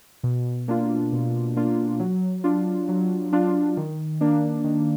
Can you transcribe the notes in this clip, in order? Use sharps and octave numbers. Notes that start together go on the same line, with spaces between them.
B2
A#3 D4 F4
B2
A#3 D4 F4
F#3
D4 F4
F#3
D4 F4
D#3
A#3 D4
D#3